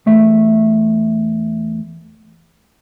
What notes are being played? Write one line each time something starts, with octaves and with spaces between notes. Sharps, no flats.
E2 A3 E5